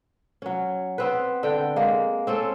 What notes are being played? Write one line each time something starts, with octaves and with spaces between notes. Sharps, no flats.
F#3 C#4
B3 C4 B4
D3 G5
G#3 A#3
C4 C#4 A4